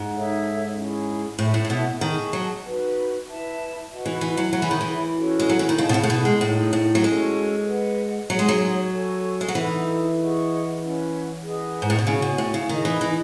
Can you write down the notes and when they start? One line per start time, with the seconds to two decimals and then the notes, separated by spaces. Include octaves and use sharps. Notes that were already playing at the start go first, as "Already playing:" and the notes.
Already playing: G#2
0.13 D#4 A4 C#5 E5
0.75 C#4 E4 G#4
1.39 A2 A4 C#5 E5 A5
1.54 A2
1.65 A2
1.70 B2
2.01 D#3 G#4 D#5 A5 C#6
2.33 F#3
2.64 D#4 F#4 B4
3.27 E4 B4 E5 A5
3.90 F#4 B4 D#5 F#5
4.06 E3
4.21 E3
4.37 F#3
4.53 F#3 G#4 C#5 E5 B5
4.62 E3
4.71 D#3
4.81 E3
5.16 C#4 F#4 A4 C#5
5.40 G#3
5.49 F#3
5.59 E3
5.69 D#3
5.78 C#3 G#4 D#5 A5
5.89 B2
5.94 C#3
6.03 A2
6.10 B2
6.25 G#3
6.41 A2 D#4 G#4 C#5
6.73 A2
6.95 F#3
7.04 G#3 C#4 F#4 A4
7.67 B4 D#5 F#5
8.30 F#3 D#4 G#4 C#5
8.39 G#3
8.49 F#3
8.93 A4 C#5 G#5 C#6
9.41 G#3
9.48 F#3
9.55 E3 D#4 A4 E5
10.19 G#4 D#5 F#5 C#6
10.80 C#4 E4 B4 F#5
11.44 G#4 B4 D#5 F#5
11.82 G#2
11.90 A2
11.99 B2
12.07 C#3 F#4 C#5 G#5 C#6
12.22 B2
12.38 A2
12.54 C#3
12.69 D#3 D#4 G#4 D#5 G#5
12.85 E3
13.01 E3